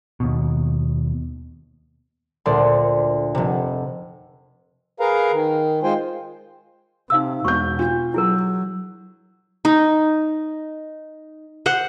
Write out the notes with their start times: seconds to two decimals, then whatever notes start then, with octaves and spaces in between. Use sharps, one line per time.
0.20 D#2 B2
2.46 D2 A#2 D4 C5 D5 C6
3.35 F1 C3
5.00 G#4 A#4 B4 F5 A#5
5.32 D#3
5.83 G#3 F4 C5 G5 G#5
7.10 C3 D#4 F5 E6
7.45 E1 B2 C#6 G6
7.79 D4 F4
8.14 F#3 E4 G#4 A#4
9.65 D#4
11.66 C5 F#5